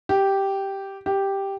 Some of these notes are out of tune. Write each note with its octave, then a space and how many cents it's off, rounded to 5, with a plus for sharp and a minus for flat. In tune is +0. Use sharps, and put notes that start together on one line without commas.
G4 -5
G4 +0